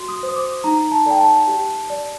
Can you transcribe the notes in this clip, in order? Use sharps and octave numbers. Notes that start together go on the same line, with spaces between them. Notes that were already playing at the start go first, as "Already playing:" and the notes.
Already playing: F#4 C6
D#6
C5
D#6
D6
D#4 A#5
A5
A4 D5 G5
A5
G4
D5